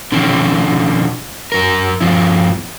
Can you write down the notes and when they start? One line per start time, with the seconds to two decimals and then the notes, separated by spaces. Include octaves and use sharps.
0.12 B2 D3 D#3 F3 C#4
1.52 F#2 A#4
2.01 G2 F3 E4